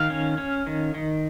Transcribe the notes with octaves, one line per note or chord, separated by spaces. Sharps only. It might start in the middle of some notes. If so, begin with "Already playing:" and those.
Already playing: D#3 F5
C#4
C#4
D#3
D#3